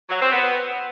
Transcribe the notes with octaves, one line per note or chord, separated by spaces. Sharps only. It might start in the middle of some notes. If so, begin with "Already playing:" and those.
F#3
C4
B3